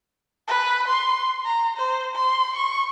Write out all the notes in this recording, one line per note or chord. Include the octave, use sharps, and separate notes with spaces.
B4
C6
A#5
C5
C6
C#6